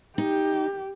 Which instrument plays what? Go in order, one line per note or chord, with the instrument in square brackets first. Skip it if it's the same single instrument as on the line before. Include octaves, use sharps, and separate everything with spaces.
[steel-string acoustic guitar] D#4 [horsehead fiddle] G4